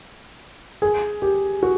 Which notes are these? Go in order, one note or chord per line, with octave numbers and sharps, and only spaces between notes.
G#4
G4
F#4